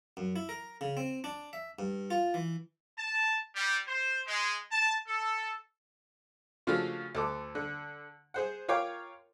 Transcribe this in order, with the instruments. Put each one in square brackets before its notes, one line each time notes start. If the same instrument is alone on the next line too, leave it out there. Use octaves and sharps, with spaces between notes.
[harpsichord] F#2
E4
A#4
C#3
C4
D4
E5
G2
F4
E3
[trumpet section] A5
G3
C5
G#3
A5
A4
[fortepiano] C#3 F3 A3 D4 F4 F#4
D2 A4 D6
D3
G#4 C5 F#5
F4 A#4 C#5 F5 G5 D6